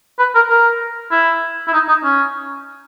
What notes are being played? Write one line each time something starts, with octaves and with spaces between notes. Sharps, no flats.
B4
A#4
A#4
E4
E4
D#4
D#4
C#4